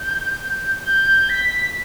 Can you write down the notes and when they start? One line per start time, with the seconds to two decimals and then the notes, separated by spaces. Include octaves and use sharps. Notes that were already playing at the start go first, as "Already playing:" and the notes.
Already playing: G6
0.83 G6
1.29 B6